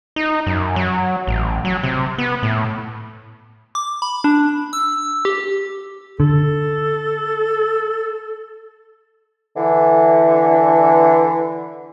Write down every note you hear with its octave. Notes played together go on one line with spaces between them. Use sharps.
D#4
F#2
F#3
A1
F#3
C3
B3
A2
D6
B5
D4
E6
G4
D3 A4
D3 E3